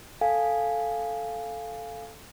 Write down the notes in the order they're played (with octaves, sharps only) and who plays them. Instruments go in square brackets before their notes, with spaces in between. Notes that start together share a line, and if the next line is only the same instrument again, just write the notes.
[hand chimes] A4 F5 G#5